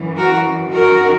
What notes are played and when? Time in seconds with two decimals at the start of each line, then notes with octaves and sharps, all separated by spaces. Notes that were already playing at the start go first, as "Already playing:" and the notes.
Already playing: F#2 E3
0.17 F#4 A#4
0.71 F#2 D#3 F#4 A#4